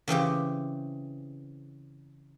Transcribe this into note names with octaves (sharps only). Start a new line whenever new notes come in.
C#3 E3 C4 G4